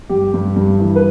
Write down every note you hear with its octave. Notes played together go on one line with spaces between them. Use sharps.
G2 G4
G2
G2
E3
B4